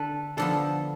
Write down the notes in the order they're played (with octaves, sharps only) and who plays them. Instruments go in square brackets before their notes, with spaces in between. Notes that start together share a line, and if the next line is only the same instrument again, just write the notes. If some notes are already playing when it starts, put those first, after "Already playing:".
Already playing: [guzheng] D3 [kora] A4 B4
[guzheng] D3 F3 B3 [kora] A4